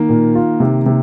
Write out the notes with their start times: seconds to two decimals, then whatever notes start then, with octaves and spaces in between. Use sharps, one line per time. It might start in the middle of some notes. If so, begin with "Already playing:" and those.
Already playing: D#3 A#3
0.09 A#2
0.35 F4
0.60 C3
0.86 C3